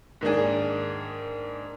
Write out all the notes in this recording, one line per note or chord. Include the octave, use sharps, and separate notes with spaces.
G#2 D#3 A#3 D4 G#4